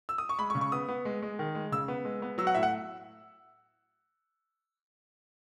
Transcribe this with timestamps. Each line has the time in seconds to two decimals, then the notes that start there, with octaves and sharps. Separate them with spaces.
0.09 E6
0.18 D#6
0.29 C#6
0.39 G#3 B5
0.50 C#6
0.55 C#3
0.61 C#6
0.72 B3 D#6
0.89 B3
1.05 G#3
1.22 G#3
1.39 D#3
1.55 G#3
1.72 C#3 E6
1.88 B3
2.05 G#3
2.22 B3
2.38 F#3 E6
2.47 F#5
2.55 A2 E5
2.63 F#5